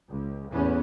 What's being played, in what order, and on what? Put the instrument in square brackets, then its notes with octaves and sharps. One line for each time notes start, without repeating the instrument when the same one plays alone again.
[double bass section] C#2
A1 E2 E3 B3 C#4